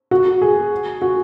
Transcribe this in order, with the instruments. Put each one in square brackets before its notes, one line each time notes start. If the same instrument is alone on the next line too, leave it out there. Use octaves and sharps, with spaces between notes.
[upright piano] F#4
G#4
F#4